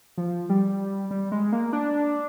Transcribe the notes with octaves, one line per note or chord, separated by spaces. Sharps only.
F3
G3
G3
G#3
A#3
D4